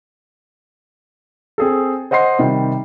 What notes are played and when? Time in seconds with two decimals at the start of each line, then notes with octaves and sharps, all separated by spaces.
1.58 C4 G#4 A4
2.11 C5 D#5 F#5 C6 C7
2.39 C3 D#3 G3